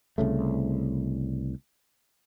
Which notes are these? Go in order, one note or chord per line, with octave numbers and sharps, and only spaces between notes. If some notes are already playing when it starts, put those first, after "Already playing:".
C2 C#3 A3